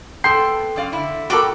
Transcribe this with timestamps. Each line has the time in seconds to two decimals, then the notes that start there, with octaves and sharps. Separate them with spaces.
0.24 B3 A4 G5 C6 G6 C7
0.76 F#2 D5 F5
0.92 D3 E4
1.30 F4 F#4 A4 A#4 G5 B5 D6